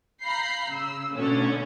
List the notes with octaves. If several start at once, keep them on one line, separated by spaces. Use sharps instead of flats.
F5 A#5 B5 G6 C7
C#3 E6
D2 B2 D3 C#4